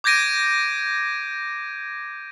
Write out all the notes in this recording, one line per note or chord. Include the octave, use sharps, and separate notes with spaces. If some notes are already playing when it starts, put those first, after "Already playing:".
D6 G6 G#6 A#6 D7 D#7